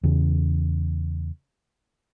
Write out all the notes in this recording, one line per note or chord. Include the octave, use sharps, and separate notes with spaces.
E2 C#3